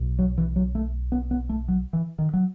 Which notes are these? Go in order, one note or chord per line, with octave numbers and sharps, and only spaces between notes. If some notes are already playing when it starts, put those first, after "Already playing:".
Already playing: B1 B2
F#3
E3
F#3
A3
B3
B3
A3
F#3
E3
D#3
F#3